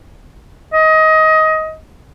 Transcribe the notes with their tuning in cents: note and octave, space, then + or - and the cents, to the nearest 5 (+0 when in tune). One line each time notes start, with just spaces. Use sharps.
D#5 +20